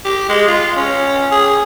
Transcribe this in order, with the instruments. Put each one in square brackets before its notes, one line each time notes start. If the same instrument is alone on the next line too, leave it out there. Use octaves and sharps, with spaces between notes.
[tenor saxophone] G4
G#3
F4
C#4
G#4